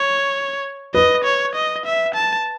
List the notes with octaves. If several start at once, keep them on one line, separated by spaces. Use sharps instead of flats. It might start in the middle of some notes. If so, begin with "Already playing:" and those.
Already playing: C#5
B4 D#5
C#5
D#5
E5
A5